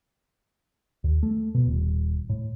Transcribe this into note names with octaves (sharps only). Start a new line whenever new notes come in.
D#2
A3
B2
D#1
A2